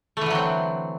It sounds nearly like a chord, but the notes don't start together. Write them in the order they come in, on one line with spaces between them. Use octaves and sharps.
A3 E3 D3 F#3 C4